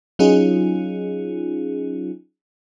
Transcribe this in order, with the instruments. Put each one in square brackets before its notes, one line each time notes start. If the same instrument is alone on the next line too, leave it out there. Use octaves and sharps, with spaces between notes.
[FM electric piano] F#3 C#4 D#4 F4 G#4